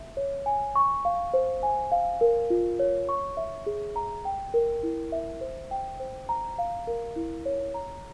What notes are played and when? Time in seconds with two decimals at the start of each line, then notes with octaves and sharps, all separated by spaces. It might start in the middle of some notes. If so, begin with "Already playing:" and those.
Already playing: E5
0.17 C#5
0.46 G#5
0.76 C#6
1.05 F5
1.34 C5
1.63 G#5
1.92 F5
2.21 A#4
2.50 F4
2.79 C#5
3.09 C#6
3.37 E5
3.66 G#4
3.96 A#5
4.25 G5
4.54 A#4
4.83 E4
5.12 E5
5.41 C5
5.71 G5
6.00 C5
6.29 A#5
6.58 F5
6.87 A#4
7.16 E4
7.46 C#5
7.74 A#5